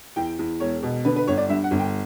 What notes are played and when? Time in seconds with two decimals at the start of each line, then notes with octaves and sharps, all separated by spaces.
0.16 E2 G5
0.39 E2
0.60 E1 C#5
0.83 B2
1.05 D3 B4
1.16 B4
1.27 G1 C#5
1.38 D5
1.49 G2 E5
1.64 F#5
1.71 G1
1.79 G5